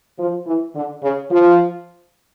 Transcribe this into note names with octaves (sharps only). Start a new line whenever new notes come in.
F3
E3
D3
C#3
F3